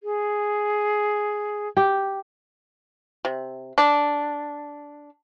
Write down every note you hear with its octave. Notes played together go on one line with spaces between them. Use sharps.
G#4
G4
C3
D4